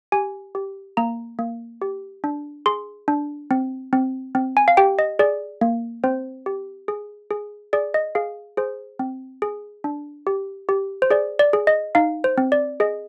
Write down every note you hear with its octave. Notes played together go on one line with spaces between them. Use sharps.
G4 G#5
G4
A#3 A#5
A#3
G4
D4
G#4 C6
D4
C4
C4
C4
G#5
F5
G4 G5
D#5
G#4 D5
A#3
C4 C5
G4
G#4
G#4
G#4 D5
D#5
G#4 F5
G#4 C5
C4
G#4
D4
G4
G4
C5
G#4 D5
D5
G#4
D#5
D#4 F5
C5
C4
D5
G#4 D#5